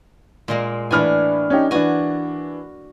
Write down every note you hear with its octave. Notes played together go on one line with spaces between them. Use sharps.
A#2 G#3 A#3
A2 E3 D4 B4 G#5 F6
C#4 D#4 G4
E3 D4 F#4 G#5